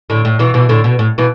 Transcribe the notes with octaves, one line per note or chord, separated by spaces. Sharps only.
A2 D3
A2
B2 E3
B2 E3
A2 D3
B2
A2
B2 E3